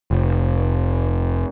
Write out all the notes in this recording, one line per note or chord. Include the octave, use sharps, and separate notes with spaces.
F1